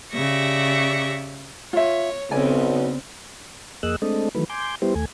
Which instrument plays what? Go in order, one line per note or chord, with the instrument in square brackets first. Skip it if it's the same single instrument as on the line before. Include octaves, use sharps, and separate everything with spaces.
[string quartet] C#3 G4 D5 E5 C#6 A#6
[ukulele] F4 E5 [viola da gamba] C#5
[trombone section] B1 [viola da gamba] C#3 B3 C4 [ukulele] D5 G#5
[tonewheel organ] F2 A#3 G#4 D#5 E6 F#6
G#3 A3 C4 D4 A4 D#5
D#3 E3 F#3 A3 B4
G#5 C6 D6 G6
G3 B3 E4 G4 C5
D#2 A3 G#5